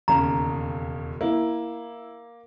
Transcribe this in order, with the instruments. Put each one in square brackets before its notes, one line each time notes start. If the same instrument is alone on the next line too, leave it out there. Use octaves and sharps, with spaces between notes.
[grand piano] E1 D#2 C#3 [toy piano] A#5
[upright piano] A#3 [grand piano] E4